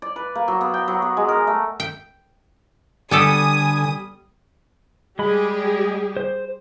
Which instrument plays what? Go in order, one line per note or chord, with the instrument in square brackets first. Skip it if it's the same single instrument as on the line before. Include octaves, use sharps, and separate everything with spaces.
[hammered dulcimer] D5
B4
A#3
F#3
B3
G5
F#3
B3
G#3
A#4
A3
[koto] G5
[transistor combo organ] D3 G#5 [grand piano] G3 [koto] B3 G4 A4 [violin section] D#6
[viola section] G3 G4 G#4 [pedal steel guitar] G#3 B5
[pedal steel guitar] C5